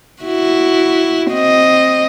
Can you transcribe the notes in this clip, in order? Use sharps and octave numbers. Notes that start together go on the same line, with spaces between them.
E4 F#4
C4 D#5